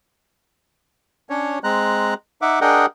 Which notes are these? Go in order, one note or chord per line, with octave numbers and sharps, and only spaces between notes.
C#4 D4 C#5
G#3 C4 A#5 F#6
D#4 E5 F#5 D6
D4 G#4 A#4 D#5 F#5 G5